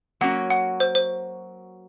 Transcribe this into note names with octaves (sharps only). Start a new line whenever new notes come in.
F#3 A#3 C#4 F#4 F#5
F#5
C5
C5